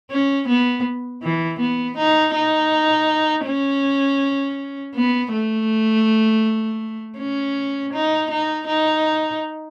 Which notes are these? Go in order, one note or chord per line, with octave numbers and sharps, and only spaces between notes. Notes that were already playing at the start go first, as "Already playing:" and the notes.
C#4
B3
E3
B3
D#4
D#4
C#4
B3
A3
C#4
D#4
D#4
D#4